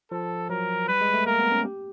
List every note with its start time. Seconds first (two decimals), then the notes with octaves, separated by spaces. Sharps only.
0.11 F3 A4
0.50 F#3 A#4
0.88 G3 B4
1.01 G#3
1.14 A3
1.26 A#3 A#4
1.39 B3
1.52 C#4
1.65 G4